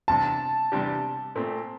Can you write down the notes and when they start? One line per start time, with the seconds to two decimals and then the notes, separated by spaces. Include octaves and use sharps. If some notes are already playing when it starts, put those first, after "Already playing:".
0.08 E2 C3 G3 D4 A5
0.72 E2 C3 G3 D4 G4
1.35 A#2 A3 C4